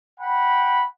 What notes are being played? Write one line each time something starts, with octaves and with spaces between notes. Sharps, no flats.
F#5 G5 B5